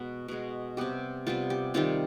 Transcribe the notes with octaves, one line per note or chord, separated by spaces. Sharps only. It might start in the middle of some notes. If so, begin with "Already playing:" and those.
Already playing: B2 G#3 B3 B4
B2 G#3 B3
C3 G3 B3 G4
C3 G3 B3 F4
G4
C3 D#3 G3 F4